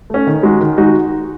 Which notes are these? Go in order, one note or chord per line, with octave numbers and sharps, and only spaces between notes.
A3 C#4
D#3
G#3 D#4 F#4
D#3
G#3 D#4 F#4